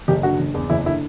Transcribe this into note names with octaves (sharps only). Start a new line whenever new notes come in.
F#1 G4
D3 F#4
F#1
E2
F#1 E4
D3 E4